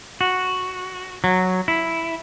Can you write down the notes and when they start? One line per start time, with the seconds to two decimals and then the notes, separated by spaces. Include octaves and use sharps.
0.21 F#4
1.24 F#3
1.68 E4